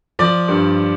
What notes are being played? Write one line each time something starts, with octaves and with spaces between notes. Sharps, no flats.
F3 D5
G2